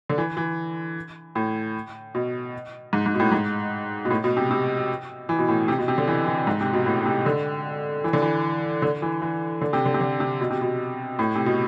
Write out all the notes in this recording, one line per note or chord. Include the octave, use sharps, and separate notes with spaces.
D3
E3
E3
A2
B2
G#2
G#2
B2
A2
G#2
B2
A2
B2
C3
C3
E3
B2
A2
C3
B2
C3
D3
E3
E3
G#2
C3
B2
A2
C3
D3
E3
D3
E3
D3
E3
E3
D3
C3
D3
C3
D3
C3
B2
C3
B2
A2
C3
B2